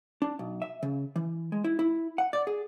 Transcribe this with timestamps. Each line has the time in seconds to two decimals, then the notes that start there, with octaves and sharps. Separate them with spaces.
0.22 D4
0.39 B1
0.62 E5
0.83 C#3
1.16 E3
1.52 G#3
1.64 E4
1.79 E4
2.18 F#5
2.33 D5
2.47 G#4